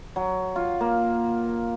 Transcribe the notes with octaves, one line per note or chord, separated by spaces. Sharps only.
F#3
F4
A#3